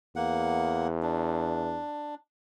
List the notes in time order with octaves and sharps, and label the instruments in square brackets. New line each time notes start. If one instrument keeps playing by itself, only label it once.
[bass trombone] E2 [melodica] A#3 F#5
[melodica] D4